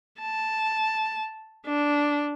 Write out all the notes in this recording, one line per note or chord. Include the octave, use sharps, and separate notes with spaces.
A5
D4